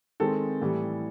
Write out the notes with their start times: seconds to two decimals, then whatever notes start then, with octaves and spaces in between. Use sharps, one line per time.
0.20 D#3 G#3 C4 A4
0.61 A2 E3 G3